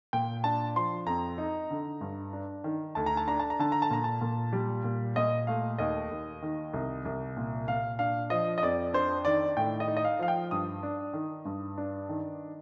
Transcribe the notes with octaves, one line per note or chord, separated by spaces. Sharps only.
A#2 G5
D4 A5
F3 C6
F2 A#5
D#4
D3
G2
D4
D#3
D2 A5
A#5
A5
D4 A#5
A5
A#5
D3 A5
A#5
A5
A#2 A#5
A5
A#2
G3
A#2
A#2 D#5
A3 F5
D#2 D#5
D#2
D#3
C2
C2
A#2
A#2 F5
D4 F5
F3 D#5
D#5
F2 D5
D4 C5
D#3 D5
A2 G5
D#5
D#4
D#5
F5
F3 F5
G5
G2 D#6
D4
D#3
G2
D4
D#3